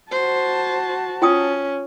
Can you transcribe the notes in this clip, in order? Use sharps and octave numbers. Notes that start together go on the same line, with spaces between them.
F#4 C5 A5
C#4 F4 G5 D#6